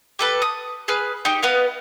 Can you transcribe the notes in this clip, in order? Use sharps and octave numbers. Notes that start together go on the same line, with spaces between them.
G4 A4 B4
D#6
G#4 B4 F6
D#4 G4
B3 B4 D#5 F5